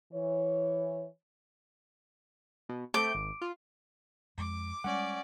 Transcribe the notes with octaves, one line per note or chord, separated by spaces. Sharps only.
E3 C#5
B2
A3 C4 D6 G6
G#1
F4
F2 G#3 D6
G3 G#3 C#4 D5 F#5